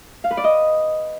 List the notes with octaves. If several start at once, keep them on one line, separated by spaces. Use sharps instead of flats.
F5
B4
D5
D#5